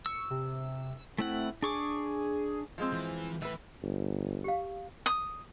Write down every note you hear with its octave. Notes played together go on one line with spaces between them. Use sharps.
C#6 E6
C3
A3 C4 E4 F#5
D4 G#4 C#6 D6
F3 G#3 C4
E3
A2 E3 B4
G1
G4 F5
D#6